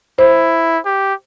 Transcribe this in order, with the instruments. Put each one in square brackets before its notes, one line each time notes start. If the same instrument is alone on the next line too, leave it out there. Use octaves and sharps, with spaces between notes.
[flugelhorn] E4 [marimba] C5
[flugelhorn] G4